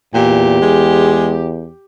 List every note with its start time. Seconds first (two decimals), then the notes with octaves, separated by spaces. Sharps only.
0.14 E2 A#2 G4
0.62 G#3